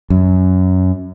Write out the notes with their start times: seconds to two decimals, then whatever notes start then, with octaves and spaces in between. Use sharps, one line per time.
0.10 F#2